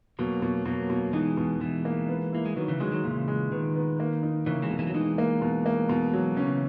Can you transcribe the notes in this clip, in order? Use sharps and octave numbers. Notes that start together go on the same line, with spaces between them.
B2 F#3 A#3
B2
B2 F#3 A#3
B2
E3 G#3 D#4
B2
B2 E3 G#3
A#3
B3
A#3 E4
G#3
D#3 F#3 B3
C#3 E3
D#3 F#3 G#3
D#3 F#3
A#2 C#3 E3
G#3
D#3 B3
B3
A#3
D#4
C#3 E3 A#3
E3 G#3
B2
E3 G#3
F#3
E3 G#3 D#4
A#3
B2
A#3
B2
F#3
C#3 E3 C#4